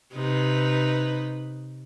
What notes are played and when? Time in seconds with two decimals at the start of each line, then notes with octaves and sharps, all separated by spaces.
0.13 C3 D#4 B4